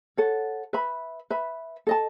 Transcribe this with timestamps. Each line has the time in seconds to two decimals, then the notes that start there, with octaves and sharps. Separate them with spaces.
0.17 A4 C#5 F#5
0.73 B4 E5 B5
1.30 B4 E5 B5
1.87 A4 D#5 A5